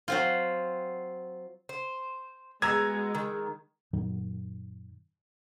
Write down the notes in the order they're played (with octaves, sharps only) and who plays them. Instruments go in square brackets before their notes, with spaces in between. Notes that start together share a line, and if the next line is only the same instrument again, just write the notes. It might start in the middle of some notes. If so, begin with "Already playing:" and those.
[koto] F#3 C4 F4
[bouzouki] C5
[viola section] G#3 [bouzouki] B3 F#4 [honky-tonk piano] A#5 E6 G#6
[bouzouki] D#3
[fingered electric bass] F#2 A#2 D#3 F#3